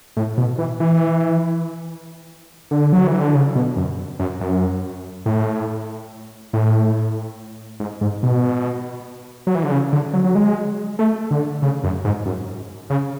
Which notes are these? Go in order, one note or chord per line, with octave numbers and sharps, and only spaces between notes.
A2
B2
E3
E3
D3
F#3
E3
D3
C#3
B2
F#2
F#2
F#2
A2
A2
G#2
G#2
B2
F#3
E3
D3
C#3
D3
F#3
F#3
G#3
A3
D3
C#3
F#2
G#2
F#2
C#3